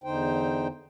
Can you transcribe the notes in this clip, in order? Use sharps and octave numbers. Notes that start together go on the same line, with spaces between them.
E2 D3 D#4 C5 G5